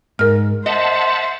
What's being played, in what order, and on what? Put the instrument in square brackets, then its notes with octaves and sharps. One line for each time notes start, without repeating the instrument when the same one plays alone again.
[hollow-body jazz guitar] G#2 [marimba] A#4 F6
[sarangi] C5 [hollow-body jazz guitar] D#5 [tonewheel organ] E5 F#5 A5